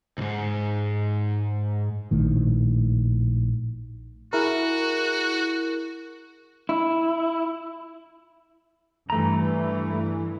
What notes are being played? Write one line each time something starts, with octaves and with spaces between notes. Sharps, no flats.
C2 G#2
A#1 A2 D#3
E4 F#4 G#4 A#4
E4
G2 E3 A3 A#5